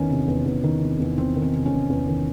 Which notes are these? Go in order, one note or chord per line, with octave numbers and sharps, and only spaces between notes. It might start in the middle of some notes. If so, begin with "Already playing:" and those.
Already playing: E2 D#3 C#4
C3
E2
E2
D#3
C3
E2
E2 C4
D#3
C4
C3
C#4
E2
E2
D#3